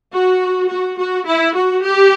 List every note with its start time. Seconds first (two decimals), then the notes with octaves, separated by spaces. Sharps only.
0.13 F#4
0.70 F#4
0.98 F#4
1.27 E4
1.56 F#4
1.84 G4